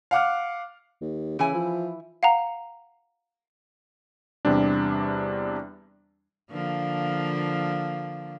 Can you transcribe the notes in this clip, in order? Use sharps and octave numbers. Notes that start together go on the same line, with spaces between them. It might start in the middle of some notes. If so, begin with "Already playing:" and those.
F5 F#5 D6 F6
D#2
C#3 E3 E4 G#5
F3
F5 F#5 A#5
E2 C3 G3 D4
D3 F3 A#3